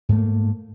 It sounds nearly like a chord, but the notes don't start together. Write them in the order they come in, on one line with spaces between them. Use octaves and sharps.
G#2 A3 A#3